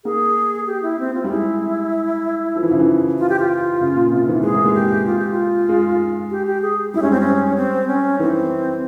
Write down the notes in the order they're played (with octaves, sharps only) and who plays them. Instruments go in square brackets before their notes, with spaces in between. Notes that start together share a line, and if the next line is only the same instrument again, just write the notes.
[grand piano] A#3 [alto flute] G#4
[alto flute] G4
E4
C4
F4
[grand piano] G3 [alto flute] F4
[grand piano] G#3 [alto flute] E4
[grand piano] F3
E3
C#3
E3
[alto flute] F4
G4
F4
[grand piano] C#3
A#2
C3
E3
[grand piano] G#3 [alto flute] G#4
[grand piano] A#3
G#3
[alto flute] G4
F4
G4
F4
[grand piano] G#3
[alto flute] G4
G4
G#4
[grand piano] G3 [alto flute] E4
[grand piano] G#3 [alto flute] C#4
[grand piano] G3 [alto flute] C4
[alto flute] C#4
C4
C#4
[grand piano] E3 [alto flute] C4